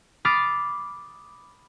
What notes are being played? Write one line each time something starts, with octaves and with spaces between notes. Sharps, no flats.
B5 D6 D#6 F6 A6 C7